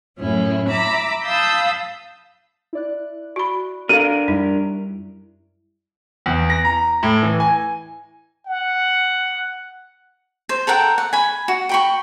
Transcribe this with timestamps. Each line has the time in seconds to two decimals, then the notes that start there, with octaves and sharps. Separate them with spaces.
0.19 F#2 A2 C#4 E4
0.68 E5 A#5 B5 D6 E6
1.24 F5 A5 B5 D#6 E6 G6
2.73 E4 D5 F#6
3.36 F#4 B5
3.89 D4 A4 A#4 F5 D#7
4.28 F#2 G3 D#4 E4
6.26 E2
6.50 A#6
6.65 A#5
7.03 A2
7.22 E3
7.40 G#5
8.46 F#5
10.49 C5
10.67 A4 A#4 F#5 G5
10.98 F#5
11.13 G#5 B5
11.48 F#4
11.69 G5 B5 C#6